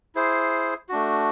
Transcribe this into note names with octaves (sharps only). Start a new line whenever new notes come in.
E4 G#4 C5
A3 D4 F#4